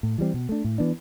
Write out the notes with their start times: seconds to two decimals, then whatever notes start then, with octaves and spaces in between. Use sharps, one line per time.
0.03 A2
0.18 E3 G3 C4
0.34 B2
0.49 A3 D4
0.64 A2
0.78 E3 B3 D4